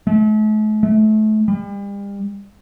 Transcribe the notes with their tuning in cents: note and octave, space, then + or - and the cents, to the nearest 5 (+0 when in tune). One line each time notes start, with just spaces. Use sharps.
A3 -45
A3 -30
G3 +40